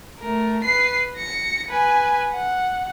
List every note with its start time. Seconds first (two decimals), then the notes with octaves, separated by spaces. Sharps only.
0.19 A3 A#4
0.64 B4 C7
1.16 A#6 C#7
1.68 B4 G#5
2.32 F#5